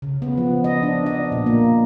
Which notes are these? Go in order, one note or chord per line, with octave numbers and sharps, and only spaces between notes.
C#3
B3
F3
D#5
D4
D#5
A#2
A#3